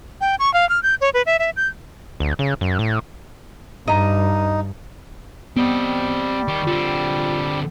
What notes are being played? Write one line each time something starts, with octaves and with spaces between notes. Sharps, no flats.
G5
C#6
F5
F6
G6
C#5
B4
E5
E5
G6
D2
C#3
F#2
A2
G2 D#4 D#5 A#5
G3 B3 C4 D#5
D#3 G4 C#6
D3 C4 F4